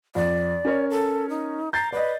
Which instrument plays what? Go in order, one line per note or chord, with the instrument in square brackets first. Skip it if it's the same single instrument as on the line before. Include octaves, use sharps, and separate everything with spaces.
[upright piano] F2 [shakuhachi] D5
[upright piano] C#4 A#4 C#5
[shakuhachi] A4
D#4
[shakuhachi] A#5 [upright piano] G6 A6 C7
[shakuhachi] B4 [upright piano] D5 D#5